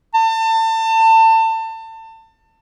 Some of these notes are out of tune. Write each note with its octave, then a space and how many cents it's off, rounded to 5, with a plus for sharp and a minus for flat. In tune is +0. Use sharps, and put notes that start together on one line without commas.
A5 +30